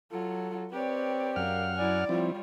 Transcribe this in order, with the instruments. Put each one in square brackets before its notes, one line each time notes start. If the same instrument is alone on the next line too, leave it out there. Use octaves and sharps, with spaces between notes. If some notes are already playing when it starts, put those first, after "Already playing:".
[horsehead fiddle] F#3 F4 [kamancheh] A4
[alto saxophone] C4 [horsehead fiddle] G4 D5 [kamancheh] B4 C#5
[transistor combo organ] F#2 F#5 F6 [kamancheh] A#4 F5
[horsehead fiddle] F#3 E4 [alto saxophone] D5 [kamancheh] G#5
[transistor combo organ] F3 C4 E4 [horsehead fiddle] G3 F4 [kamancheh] C#5